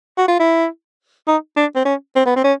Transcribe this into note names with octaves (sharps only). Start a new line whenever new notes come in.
F#4
F4
E4
D#4
D4
C4
C#4
C4
B3
C4
C#4